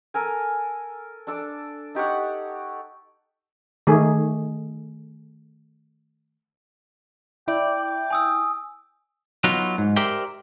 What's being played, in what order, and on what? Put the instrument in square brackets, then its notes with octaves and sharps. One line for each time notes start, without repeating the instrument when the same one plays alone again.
[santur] A4 A#4 G#5
D4 A4 D5
D#4 G4 C#5 F#5
[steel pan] D#3 A3 G#4
[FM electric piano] E4 [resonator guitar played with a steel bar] D5 [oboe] G5
[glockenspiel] G#5 D#6 E6
[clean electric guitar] F#3 B3 D#4 F4
G#2
G4 A#4 C5 D5 E5 G5